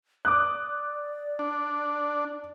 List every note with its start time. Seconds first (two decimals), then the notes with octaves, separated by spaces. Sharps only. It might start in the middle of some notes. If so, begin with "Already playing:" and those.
0.25 D5 D6 D#6 F#6
1.39 D4